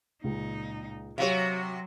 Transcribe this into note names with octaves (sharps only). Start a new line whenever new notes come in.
C#2 A#2 D#4
C3 F#3 F#4 C#5 F5